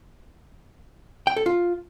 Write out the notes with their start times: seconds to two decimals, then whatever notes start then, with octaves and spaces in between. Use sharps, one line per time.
1.27 G5
1.36 A4
1.46 F4